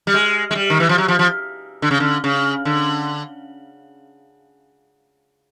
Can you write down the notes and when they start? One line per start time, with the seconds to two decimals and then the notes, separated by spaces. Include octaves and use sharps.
0.07 G3
0.14 G#3
0.51 G#3
0.55 G3
0.70 D#3
0.80 E3
0.89 F3
0.98 F#3
1.08 F3
1.19 F3
1.82 D3
1.91 C#3
2.00 D3
2.24 C#3
2.65 D3